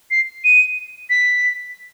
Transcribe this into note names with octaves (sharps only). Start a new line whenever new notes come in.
C7
D#7
B6